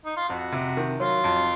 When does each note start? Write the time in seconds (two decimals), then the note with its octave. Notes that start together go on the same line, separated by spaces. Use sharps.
0.05 D#4
0.17 F4
0.29 F2 F#4
0.52 C3
0.77 D#3
1.00 F#3 F4
1.24 F2